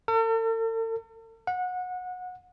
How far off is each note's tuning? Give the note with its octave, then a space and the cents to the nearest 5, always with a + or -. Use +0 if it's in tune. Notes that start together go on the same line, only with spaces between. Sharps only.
A4 +45
F#5 -25